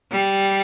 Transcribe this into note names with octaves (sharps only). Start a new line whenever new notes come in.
G3